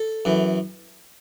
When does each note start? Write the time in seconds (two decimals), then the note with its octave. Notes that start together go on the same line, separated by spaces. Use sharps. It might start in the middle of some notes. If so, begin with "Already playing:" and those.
Already playing: A4
0.25 F#2 E3